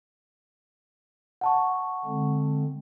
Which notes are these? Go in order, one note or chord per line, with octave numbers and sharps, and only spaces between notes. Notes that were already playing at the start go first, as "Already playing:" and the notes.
F#5 A5 C#6
D3 G#3 C4